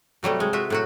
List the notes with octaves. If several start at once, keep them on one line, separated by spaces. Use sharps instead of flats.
C3 F#3 G3 A3
G#3
F4 F#4 E5
A2 F#3 F#4